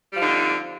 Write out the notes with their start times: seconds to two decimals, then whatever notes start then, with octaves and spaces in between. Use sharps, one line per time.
0.11 G3
0.15 F3
0.18 D3
0.22 D#4
0.26 C4